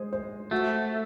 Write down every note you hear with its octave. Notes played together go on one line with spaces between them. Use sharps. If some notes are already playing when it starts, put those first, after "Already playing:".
Already playing: G#3 C5
C5
A3 F#4